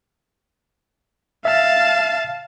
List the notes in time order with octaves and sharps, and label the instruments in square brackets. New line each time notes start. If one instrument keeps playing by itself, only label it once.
[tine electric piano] E5 F6 [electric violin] F5 A5